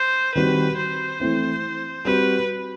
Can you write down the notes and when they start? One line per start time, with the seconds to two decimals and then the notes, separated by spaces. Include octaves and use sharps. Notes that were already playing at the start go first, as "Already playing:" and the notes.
Already playing: C5
0.35 D#3 G3 C4 F#4 B4
0.77 C5
1.20 E3 A3 C4 E4
2.05 G3 C4 F#4 B4